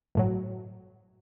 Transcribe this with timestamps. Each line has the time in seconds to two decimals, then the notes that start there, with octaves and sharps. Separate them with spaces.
0.15 G1 A2 F#3